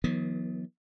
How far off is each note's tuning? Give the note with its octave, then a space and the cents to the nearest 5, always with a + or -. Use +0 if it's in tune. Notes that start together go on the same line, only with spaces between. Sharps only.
D#3 +35 F#3 -45 B3 -30